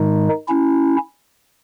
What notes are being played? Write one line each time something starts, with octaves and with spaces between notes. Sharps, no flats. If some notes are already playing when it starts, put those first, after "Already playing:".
Already playing: G#2 D#3 G#3 D#4
C#4 E4